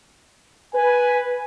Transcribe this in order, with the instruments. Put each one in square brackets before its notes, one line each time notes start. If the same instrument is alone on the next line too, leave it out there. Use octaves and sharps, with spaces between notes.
[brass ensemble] B4 [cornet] G#5